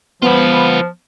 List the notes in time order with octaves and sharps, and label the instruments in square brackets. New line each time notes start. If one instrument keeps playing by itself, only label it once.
[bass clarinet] F3 [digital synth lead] B3 [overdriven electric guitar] F4 B4